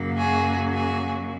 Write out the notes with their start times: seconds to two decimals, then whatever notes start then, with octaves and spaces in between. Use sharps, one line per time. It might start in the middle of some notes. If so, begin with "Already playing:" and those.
Already playing: F#2 C#3 F#3 A#3
0.16 F#4 G#4
0.70 F#4 G#4